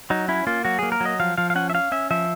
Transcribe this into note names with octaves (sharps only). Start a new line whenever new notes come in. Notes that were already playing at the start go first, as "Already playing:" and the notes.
F#3 D#4
C#4 E4
A#3 F4
F#3 F#4
A#3 G#4
A#4
F#3 D#5
F3 F5
F3 F5
F5
C#4 F#5
E5
C#4 F5
C#4 E5
F3 E5